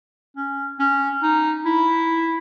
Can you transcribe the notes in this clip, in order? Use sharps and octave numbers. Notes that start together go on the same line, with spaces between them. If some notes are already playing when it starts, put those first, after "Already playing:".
C#4
C#4
D#4
E4